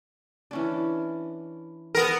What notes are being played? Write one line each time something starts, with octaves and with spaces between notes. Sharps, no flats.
E3 C#4 D4
B3 A#4